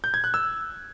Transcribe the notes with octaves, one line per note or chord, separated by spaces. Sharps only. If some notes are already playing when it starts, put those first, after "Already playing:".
G6
G#6
F#6
E6